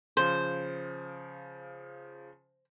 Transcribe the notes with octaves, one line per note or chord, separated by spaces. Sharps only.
C#3 F3 C5